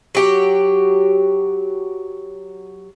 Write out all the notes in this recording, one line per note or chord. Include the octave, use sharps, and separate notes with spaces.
F#3 G4